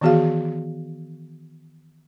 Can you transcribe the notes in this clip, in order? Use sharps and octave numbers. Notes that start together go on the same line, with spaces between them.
D#3 E3 B3 F#4 G#4 F5